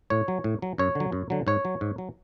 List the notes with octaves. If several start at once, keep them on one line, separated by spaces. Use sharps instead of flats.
A2 C#5
F#3
A2
F#3
F#2 C#5
D3 F#3
F#2
D3 F#3
G#2 C#5
F#3
G#2
F#3